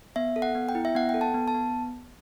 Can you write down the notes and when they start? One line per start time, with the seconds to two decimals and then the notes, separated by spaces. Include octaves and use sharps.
0.16 B3 E5
0.36 A4
0.42 F#5
0.55 B3
0.69 G5
0.75 E4
0.85 E5
0.95 B3 F#5
1.09 G5
1.14 A4
1.21 A5
1.34 B3
1.48 A5
1.54 B3